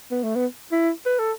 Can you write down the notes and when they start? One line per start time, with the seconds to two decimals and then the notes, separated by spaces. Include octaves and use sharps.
0.11 B3
0.23 A3
0.35 B3
0.72 E4
1.06 B4
1.19 A4